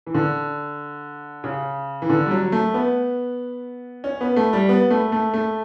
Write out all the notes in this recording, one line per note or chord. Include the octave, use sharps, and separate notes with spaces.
E3
D3
C#3
E3
D3
G3
F#3
A3
B3
C#4
B3
A3
G3
B3
A3
A3
A3